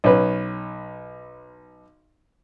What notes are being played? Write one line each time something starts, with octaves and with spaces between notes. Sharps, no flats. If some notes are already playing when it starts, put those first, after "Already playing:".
B1 C#4 B4